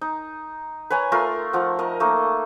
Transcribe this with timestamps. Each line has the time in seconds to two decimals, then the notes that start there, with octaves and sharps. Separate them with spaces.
0.01 D#4
0.90 B4 C#5 G#5 A#5
1.12 A3 F4 A#4 C6
1.53 F3 F#5
1.79 A#4 D#5
2.00 A3 A#3 D#4